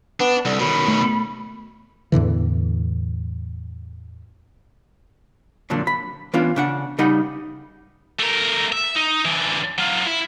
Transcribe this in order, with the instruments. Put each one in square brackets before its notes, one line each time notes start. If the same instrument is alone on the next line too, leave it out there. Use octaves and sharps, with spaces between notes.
[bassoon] B3 [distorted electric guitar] D4
[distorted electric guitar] C2 [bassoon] D3
[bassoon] F#2 [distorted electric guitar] B2 D#3 [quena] B5
[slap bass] A3
[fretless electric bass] E2 A2 D3 E3
[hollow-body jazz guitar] F2 A#2 D3 F#3 D4
B5
E3 B3 C#4 D4 F4
C#3 D4 F#5
C#3 G3 D#4 D#5 F#5 B5
[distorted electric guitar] A3 A#4
E5
D#4
D3 E3
F#3 F4
E4